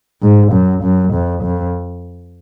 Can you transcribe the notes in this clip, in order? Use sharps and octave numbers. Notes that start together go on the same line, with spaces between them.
G#2
F#2
F#2
F2
F2